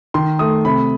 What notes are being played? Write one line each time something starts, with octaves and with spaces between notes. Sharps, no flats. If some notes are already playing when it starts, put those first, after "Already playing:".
D#3 C6
A3 D#6
C3 B5